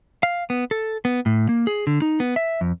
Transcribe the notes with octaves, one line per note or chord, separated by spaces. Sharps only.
F5
B3
A4
B3
A2
A#3
G#4
D3
D#4
B3
E5
F2